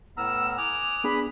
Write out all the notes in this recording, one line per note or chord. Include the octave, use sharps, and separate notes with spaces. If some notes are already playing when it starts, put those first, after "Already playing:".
A2 B3 A#5 E6 F6
G#5 D6 D#6 F#6 F7
B3 D4 G#4 B5